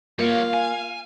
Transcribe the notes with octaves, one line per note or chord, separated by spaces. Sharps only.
G3 A#3 F4 C#5 F5
G#5